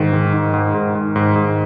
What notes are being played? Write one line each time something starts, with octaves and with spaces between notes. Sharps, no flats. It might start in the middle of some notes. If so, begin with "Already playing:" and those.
Already playing: G#2 D#3
D#3
G#2
G#2
G#2
G#2
G#2
G#2